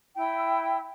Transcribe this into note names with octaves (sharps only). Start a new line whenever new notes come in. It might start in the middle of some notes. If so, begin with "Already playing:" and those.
E4 G5